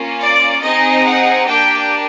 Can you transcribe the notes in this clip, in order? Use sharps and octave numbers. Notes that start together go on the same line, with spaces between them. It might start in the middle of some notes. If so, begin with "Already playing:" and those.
Already playing: A#3 C#4 F4
D5
C4 D#4 G#4 D#5
F#5
A#3 D4 G4 G5